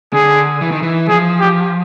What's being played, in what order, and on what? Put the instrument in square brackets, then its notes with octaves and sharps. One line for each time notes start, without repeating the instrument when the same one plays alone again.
[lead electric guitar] D3 [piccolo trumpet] G#4
[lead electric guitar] E3
D#3
E3
[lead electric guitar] F3 [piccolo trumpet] G#4
[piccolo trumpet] G4